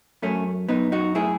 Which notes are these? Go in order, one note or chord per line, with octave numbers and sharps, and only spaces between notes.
F#2 A3 C#4
F#2 B3 D#4
D#4 F#4
A2 E4 G#4